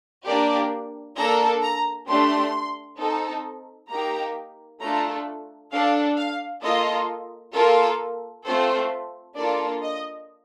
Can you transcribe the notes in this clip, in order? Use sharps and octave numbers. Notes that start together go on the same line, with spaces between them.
A#3 D4 G4 D5
A#3 D4 A4 A#5
A#5
A3 D4 G4 C6
C4 D#4 A4
A#3 D#4 G4 A#5
A3 D4 F4 A4 A#5
D4 A4 F5
F5
A#3 F4 A4 D#5
A#3 F4 A4 A#4
A3 C4 F4 A4 C5
A#3 D4 F4 A4 D5
D#5